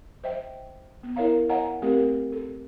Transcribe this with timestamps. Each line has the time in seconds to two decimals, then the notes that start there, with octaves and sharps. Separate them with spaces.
0.24 C5 D#5 E5 G5
1.03 B3
1.16 E4 A#4 C#5 E5 F5 A#5
1.49 C#5 D#5 F5 F#5 G#5 A#5
1.82 A3 C4 G4 A#4
2.32 A4